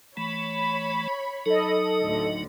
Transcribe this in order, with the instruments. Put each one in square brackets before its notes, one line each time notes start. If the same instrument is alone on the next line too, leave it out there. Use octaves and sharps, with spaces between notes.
[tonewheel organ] E3 A3 [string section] C#5 B5
[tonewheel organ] F#3 D#4 [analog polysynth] A4 D#5
[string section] D2 A2 D3